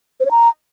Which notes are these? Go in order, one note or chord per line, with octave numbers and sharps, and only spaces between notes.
C5
C#5
A#5